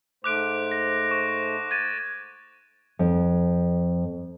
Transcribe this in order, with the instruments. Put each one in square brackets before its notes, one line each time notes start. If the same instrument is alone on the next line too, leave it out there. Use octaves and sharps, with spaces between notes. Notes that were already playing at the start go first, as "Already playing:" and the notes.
[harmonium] G#2 A3 C5 [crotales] D6 F#6 D7
[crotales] A#6
C#6
G#6 A6 D#7
[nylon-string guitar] F2